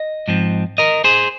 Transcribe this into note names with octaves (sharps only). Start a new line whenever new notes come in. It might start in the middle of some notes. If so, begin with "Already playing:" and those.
Already playing: D#5
G#2 F3 C4
A#4 D#5
G#4 C5